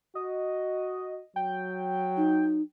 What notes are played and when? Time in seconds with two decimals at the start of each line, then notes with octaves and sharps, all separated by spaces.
0.15 F#4 D#5
1.36 F#3 G5
2.17 D#4